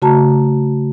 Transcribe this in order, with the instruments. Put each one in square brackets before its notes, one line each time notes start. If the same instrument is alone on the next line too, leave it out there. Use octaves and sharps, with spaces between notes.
[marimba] C#3 A3 F#4 A5 A#5